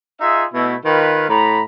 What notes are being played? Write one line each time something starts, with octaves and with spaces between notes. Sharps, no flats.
D#4 F4 G#4 E5
B2 A3 E4
D#3 F4 B4
A2 A#5 B5